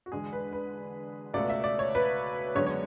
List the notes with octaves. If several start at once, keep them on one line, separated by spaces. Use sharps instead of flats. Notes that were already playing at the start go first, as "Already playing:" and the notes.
F#4
E2 D3 G#3 G#4
B4
B4
C#2 B2 A3 D5
E5
D5
C#5
B4
F#2 D3 G#3 B3 C#5
C#5